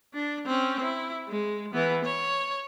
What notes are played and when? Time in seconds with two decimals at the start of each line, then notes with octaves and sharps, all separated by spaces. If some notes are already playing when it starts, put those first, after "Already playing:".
0.14 D4
0.46 C4 C#4
0.84 E4
1.28 G#3
1.73 E3 B3
2.04 C#5